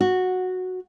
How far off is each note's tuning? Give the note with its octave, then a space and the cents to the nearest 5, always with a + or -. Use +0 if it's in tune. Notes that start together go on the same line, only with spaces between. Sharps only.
F#4 -5